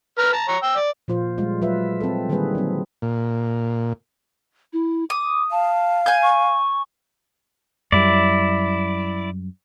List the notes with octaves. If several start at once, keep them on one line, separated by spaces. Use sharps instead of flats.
B4 A#5 F6
A5 A#5
C#5 A#5
G5 E6
D5
A#2 F3 F4 C5
G3 G#3 F4
F#3 F4 B4 E5
C4 A4
D3 D#3 G3 A#3 G#4 B4
F#3 C4
A#2
E4
D6 D#6
F5 A5
G#5 G6
C#6
F#2 G3 E4 D5